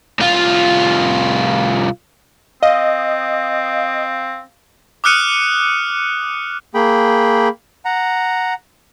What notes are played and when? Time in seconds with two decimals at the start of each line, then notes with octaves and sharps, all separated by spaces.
0.19 C2 F4
2.63 C4 D#5 F5
5.04 D6 D#6 F6 F#6 C#7 D#7
6.74 A#3 G#4 G5 B5
7.85 F#5 A#5